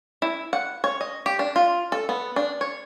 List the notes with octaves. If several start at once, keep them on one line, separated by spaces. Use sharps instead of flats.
E4
F#5
C#5
D#5
G4
D4
F4
A4
B3
D4
C#5